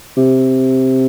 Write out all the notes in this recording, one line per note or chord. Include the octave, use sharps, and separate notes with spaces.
C3